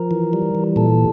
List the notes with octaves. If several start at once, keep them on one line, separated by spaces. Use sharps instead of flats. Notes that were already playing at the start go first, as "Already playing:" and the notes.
Already playing: F3 A#4
E3
G3
E3
A#2 A4